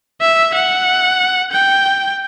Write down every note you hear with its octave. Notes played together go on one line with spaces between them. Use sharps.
E5
F#5
G5